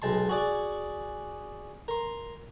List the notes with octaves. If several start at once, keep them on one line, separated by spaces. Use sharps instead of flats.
B1 G#3 A5 C6
F#4 G#4 D5
A#4 C6